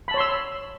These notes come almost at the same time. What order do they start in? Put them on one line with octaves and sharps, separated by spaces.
B5 A5 C#5 C6 E6